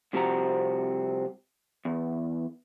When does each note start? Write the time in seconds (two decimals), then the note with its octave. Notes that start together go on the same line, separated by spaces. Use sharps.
0.13 C2 C3 F3 C4 F#4 A#5
1.85 E2